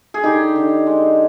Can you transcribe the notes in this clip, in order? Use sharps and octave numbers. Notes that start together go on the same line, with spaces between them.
G#4
D3 D#4 G4
D3
G#3